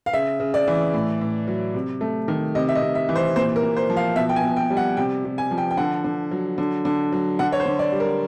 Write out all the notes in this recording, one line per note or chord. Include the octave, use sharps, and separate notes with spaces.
F5
C#3 E5
C#3
D5
E3
A2
A2
F#3
C3
A3
D#3
C3 D#5
E5
D#5
C3
E5
E3
C5
A#2 C5
A#4
A#2
C5
F3
F5
B2 E5
G5
G#5
B2
G5
G3
F#5
C3 G5
C3
G#5
F3
G5
G5
D3 F#5
D3
F#3
D3
D3
F#3
D3 F#5
C#5
C5
D3
D5
G3
A#4